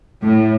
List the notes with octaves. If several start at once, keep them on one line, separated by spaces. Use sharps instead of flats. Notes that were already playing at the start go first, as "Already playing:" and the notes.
A2